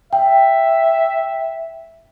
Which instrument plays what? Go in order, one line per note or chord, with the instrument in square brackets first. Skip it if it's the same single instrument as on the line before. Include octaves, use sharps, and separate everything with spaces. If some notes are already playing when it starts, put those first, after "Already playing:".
[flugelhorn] E5 [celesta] G5